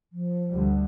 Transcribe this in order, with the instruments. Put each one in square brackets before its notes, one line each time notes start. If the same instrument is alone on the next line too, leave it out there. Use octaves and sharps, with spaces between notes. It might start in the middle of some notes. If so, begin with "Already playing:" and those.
[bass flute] F3
[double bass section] D2 D3 G3